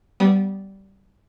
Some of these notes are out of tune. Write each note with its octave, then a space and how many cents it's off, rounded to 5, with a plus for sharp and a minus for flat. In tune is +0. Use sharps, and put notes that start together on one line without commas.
G3 -15 B3 +0 D#6 -10